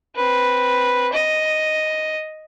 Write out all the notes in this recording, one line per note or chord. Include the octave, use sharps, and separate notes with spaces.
C4 B4
D#5